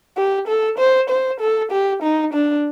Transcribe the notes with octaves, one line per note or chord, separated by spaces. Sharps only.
G4
A4
C5
C5
A4
G4
D#4
D4